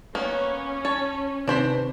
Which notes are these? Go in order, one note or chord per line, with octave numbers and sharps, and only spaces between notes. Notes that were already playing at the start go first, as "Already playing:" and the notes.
A#3 B3 C#4
C#5 A5
C3 D#3 D4 B4 C5 B5